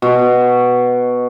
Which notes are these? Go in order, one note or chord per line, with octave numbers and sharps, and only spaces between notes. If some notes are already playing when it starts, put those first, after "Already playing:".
B2